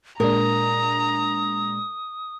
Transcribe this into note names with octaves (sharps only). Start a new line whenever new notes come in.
A#2 G#3 D4 A#4 A#5 D#6